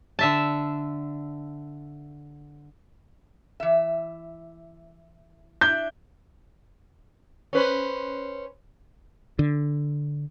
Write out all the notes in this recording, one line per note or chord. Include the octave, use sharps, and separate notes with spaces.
D3 E5 A5
E3 E5
D4 E4 G6
C#4 B4 C5
D3